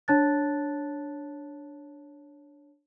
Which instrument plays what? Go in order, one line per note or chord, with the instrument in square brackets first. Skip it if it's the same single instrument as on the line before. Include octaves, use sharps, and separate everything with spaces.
[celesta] D4 C#5 A5 F#6 A6